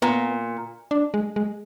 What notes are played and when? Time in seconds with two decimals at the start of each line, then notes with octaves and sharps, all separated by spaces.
0.02 A#2 B3
0.91 D4
1.14 G#3
1.36 G#3